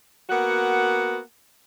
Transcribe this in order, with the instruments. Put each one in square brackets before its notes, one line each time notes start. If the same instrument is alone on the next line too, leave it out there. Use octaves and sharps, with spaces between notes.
[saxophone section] A#3 B3 F#4 F#5